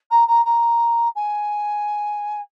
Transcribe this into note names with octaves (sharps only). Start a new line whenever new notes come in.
A#5
A#5
A#5
G#5